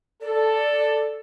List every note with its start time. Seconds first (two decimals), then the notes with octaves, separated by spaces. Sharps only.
0.22 A4 D5